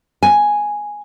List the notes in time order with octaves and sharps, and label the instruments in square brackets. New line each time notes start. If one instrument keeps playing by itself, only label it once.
[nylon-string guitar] G#5